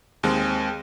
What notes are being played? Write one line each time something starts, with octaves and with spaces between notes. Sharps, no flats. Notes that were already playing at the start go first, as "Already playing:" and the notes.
D#2 G#3 C4